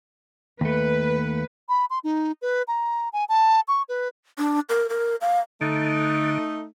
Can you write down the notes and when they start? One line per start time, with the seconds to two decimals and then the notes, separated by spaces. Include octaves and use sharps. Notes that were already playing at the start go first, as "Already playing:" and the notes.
0.61 D#2 A3 B4
1.69 B5
1.90 C6
2.04 D#4
2.42 B4
2.68 A#5
3.13 G#5
3.29 A5
3.68 C#6
3.89 B4
4.38 D4
4.69 A#4
4.89 A#4
5.21 F5
5.61 D3 A3 D#4